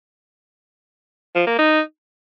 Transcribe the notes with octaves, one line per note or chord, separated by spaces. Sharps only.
F3
A#3
D#4